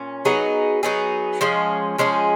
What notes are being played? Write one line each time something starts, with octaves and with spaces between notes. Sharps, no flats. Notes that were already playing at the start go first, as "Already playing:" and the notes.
Already playing: A#2 C#4
F#3 B3 D#4 G#4
F#3 B3 D#4 G#4
F3 G#3 C#4 G#4
F3 G#3 C#4 G#4